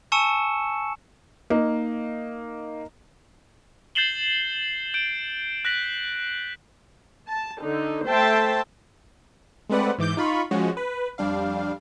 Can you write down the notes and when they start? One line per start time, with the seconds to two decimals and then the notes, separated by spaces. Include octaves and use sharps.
0.12 G#5 A5 C#6 E6 C#7 E7
1.50 A#3 D#4
3.95 G6 A6 C7 E7 F#7 G7
4.94 G6 D7
5.65 F#6 A#6 B6 F#7
7.30 A5
7.60 D3 D#4
8.07 A3 C5 E5 G5 A5
9.69 G#3 A3 C4 B4 D5 F#5
9.98 G#2 E3 D6 G6
10.17 D#4 F4 B5 C#6
10.51 F3 G#3 C#4 F#4
10.77 B4
11.18 F2 G3 D4 F5